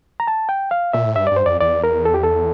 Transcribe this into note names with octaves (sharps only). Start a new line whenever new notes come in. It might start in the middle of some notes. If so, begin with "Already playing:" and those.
A#5
A5
G5
F5
A#2 E5
A2
G2 E5
G2 D5
C5
F2 D5
E2 D5
A#4
A4
G4
A4